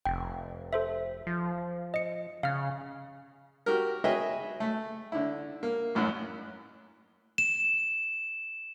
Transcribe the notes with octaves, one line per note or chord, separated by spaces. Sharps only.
F1 G5
A4 C5 E5
F3
D#5 C#7
C#3 F5 F6
F#4 G4 A#4
F#4 G#4 B4 D#5 E5 G5
A3
D3 E4
A#3
A1 F#2 A2 F#6
E7